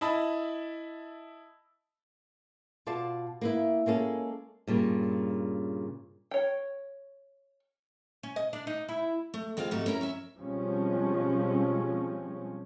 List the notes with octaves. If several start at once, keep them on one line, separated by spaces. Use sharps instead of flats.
E4 D#5 A5 B5
B2 F4 D5 A5
A#3 B3 E4
G#3 A#3 C#4 A4
G2 A#2 C#3
C#5 G5
C#4
D#5
D4
D#4
E4
A3
A2 G#3 C4 F4 F5
G#2 C3 A3 D#4 F#4
C#4 E4 A#4 F#5 A#5
C#4 C#5 E5
B2 F3 G3 G#3 C4 C#4